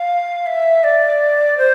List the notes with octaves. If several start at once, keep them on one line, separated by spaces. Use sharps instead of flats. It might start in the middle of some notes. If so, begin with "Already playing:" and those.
Already playing: F5
E5
D5
C5